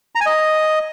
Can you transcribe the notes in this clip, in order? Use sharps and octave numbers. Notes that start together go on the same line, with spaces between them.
A#5
G#5
D#5